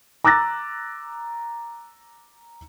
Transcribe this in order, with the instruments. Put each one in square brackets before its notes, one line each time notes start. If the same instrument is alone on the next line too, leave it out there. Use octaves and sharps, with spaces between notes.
[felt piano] A#5 D6 E6 F#6 A6 A#6